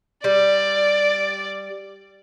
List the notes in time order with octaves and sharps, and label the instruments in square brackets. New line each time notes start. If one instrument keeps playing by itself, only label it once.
[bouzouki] G3 [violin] D5